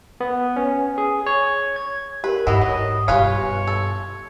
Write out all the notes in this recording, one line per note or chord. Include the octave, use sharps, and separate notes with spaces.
B3
C#4
G#4
C#5
G#6
G4 A#4 B4
G#2 E3 E4 D#5 F#5 B5
F#3
G2 B2 F4 G4 B4 C#5 F5 G#5
A4